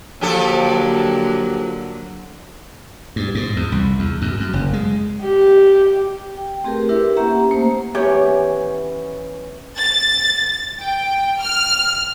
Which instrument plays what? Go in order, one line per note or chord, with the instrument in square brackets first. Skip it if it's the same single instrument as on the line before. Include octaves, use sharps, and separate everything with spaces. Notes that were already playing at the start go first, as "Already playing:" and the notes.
[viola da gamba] D3 F#3 A#3 [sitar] F3 G4 A4
[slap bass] G2
G#2
E2
C2
E2
F#2
F#2
F#1
G#3
[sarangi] G4
[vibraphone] G5
A3 C4 G4 G#4 A#4 B4
D4 E4 G4 A#4 B4 E5
A#3 C#4 G4 E5 F#5 A#5
A3 A#3 C5 A#5
[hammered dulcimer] E3 B3 C#4 [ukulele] G4 C#5
[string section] A6
G5
F6